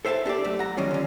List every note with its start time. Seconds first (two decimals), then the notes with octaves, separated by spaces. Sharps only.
0.05 A4 C5 E5 G5 A5
0.25 D4 G4 A4 D5
0.44 F#2 A3
0.59 F#5 A#5
0.77 D#3 F#3 G3 C#4 F4
0.91 D3 C#4